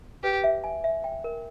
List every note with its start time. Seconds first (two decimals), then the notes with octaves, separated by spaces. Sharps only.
0.24 G4 B4
0.44 E5
0.64 G#5
0.84 E5
1.04 G5
1.24 A#4